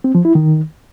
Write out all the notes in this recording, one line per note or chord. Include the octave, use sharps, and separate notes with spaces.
C4
F3
E4
D#3